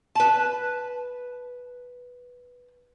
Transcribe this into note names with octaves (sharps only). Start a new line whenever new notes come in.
B4 A5